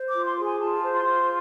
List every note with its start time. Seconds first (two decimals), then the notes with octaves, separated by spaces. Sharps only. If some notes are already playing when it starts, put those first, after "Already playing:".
Already playing: C5
0.09 F4 D6
0.25 C6
0.37 G#4
0.43 G#5
0.59 F4 A5
0.82 C5
0.93 C6
1.04 F4